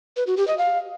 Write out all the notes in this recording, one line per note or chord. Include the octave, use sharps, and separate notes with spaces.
B4
F#4
G4
D#5
F5